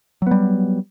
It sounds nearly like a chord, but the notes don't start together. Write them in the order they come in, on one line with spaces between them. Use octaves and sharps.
F#3 B3 G3